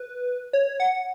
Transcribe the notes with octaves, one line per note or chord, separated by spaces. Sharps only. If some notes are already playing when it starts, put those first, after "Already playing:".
Already playing: B4
C#5
F#5